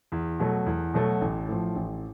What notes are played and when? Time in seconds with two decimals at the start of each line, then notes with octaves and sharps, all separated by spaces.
0.12 E2
0.40 B2 F#3 A3
0.66 E2
0.94 B2 F#3 A3
1.21 A1
1.48 A2 F3
1.76 A1